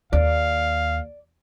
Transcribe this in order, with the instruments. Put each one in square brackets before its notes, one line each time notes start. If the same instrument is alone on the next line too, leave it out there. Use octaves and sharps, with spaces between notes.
[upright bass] D#2 [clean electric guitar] D5 [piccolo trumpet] F5